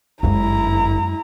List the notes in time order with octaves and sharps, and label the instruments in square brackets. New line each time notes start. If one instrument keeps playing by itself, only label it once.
[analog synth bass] G1 [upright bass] F#2 G#3 [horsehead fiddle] E4 A#5